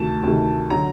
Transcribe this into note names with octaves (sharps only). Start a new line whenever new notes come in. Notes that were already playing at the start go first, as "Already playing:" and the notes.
Already playing: D2 C3 D#3 A3 A5
D2 C3 D#3 A3
D3 F#3 A#5